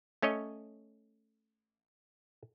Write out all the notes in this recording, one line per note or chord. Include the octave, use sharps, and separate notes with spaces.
A3 C#4 C#5 D#5